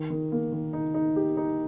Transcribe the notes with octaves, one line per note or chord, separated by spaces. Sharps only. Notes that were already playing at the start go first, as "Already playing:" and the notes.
Already playing: D#3
D#3
A#3
D#3
D#4
D#4
G4
D#4